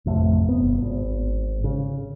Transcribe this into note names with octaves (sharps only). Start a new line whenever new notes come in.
A1 F2 C3 A3
G1 B3
G#1
C#3